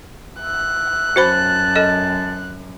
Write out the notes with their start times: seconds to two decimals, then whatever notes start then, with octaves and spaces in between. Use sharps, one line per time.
0.41 E5 F#6
1.16 F#2 F#4 C5 A5 B5
1.76 A4 D#5